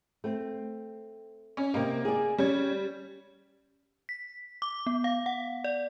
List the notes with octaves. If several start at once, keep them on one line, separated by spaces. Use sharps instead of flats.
A3 C4
C#4
C3 A#3 A#4 D#5
G#4 D5
G3 C#4 G#6
B6
D6
B3
F5
F#5
D5